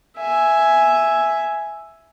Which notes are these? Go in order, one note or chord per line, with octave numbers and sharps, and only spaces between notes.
E5 G#5